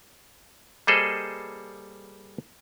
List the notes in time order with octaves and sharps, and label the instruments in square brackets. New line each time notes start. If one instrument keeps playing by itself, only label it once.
[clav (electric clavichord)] G3 A#3 G#4 A4 C5 D#5